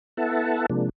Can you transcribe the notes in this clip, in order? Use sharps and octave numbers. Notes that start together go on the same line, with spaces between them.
B3 E4 A4 E5 F#5 A5
C3 F3 G#3 A#3 D4